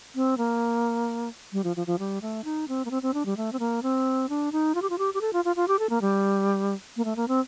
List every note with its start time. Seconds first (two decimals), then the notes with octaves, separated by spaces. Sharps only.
0.15 C4
0.38 A#3
1.53 G3
1.64 F3
1.76 F3
1.87 F3
1.99 G3
2.22 A3
2.44 D#4
2.68 C4
2.85 A#3
2.91 C4
3.03 C4
3.14 D4
3.26 G3
3.37 A3
3.53 C4
3.60 A#3
3.83 C4
4.29 D4
4.52 D#4
4.75 F4
4.82 G4
4.90 F4
4.99 G4
5.14 G4
5.21 A4
5.33 F4
5.45 F4
5.56 F4
5.68 G4
5.79 A4
5.90 A#3
6.02 G3
6.97 A#3
7.05 A3
7.16 A#3
7.28 C4